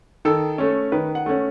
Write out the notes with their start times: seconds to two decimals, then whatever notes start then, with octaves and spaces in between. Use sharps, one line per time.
0.25 D#3 A4
0.58 A3 C#4
0.92 D#3 B4
1.15 F#5
1.26 A3 C#4